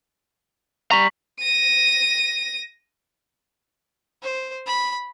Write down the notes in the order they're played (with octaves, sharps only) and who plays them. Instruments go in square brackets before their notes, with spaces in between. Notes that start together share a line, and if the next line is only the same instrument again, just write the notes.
[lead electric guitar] G3 A#5 [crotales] C#6 B6 F#7
[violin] A#6 D#7
[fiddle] C5
B5